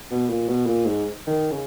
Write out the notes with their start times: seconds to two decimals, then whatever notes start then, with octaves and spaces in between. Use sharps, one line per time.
0.11 B2
0.30 A#2
0.49 B2
0.66 A#2
0.85 G#2
1.27 D#3
1.52 C#3